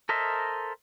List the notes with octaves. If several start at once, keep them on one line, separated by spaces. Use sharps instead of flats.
A4 A#4 C5 D#5 E5